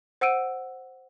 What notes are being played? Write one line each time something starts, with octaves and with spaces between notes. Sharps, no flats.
C5 F#5 E6 D7 D#7